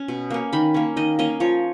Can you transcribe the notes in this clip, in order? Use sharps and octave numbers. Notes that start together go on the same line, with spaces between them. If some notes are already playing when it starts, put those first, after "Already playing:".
Already playing: C#4
B2
A#3 C#4
D#3 B5
A#3 C#4
D#3 D#5
A#3 C#4 D#5
F3 C#5